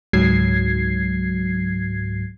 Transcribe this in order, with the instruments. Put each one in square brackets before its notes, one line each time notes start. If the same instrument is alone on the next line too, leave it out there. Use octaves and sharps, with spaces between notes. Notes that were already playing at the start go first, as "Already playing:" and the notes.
[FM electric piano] C#2 G#2 F#3 G#6 C7